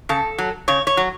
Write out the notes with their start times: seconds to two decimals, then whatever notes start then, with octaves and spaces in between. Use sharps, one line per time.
0.09 C#3 A4
0.38 F#3
0.68 C#3 C#5
0.87 C#5
0.97 F#3